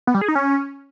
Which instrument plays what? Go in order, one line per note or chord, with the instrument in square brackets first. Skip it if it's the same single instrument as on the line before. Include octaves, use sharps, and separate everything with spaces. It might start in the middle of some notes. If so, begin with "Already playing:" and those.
[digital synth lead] B3
G3
G#4
D#4
C#4